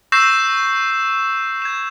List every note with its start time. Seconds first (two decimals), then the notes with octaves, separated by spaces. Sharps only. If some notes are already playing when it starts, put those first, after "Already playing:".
0.12 C#6 E6 G6 A#6 C7 E7
1.62 G#6 E7